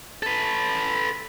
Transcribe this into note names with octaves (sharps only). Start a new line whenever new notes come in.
A4 B4